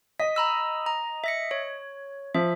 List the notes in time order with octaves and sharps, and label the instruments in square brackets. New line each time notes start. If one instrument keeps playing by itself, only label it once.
[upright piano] D#5 [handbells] B6
[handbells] A#5 B5 E6
A#5
E5 A#6 C#7
C#5
[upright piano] F3 [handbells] E5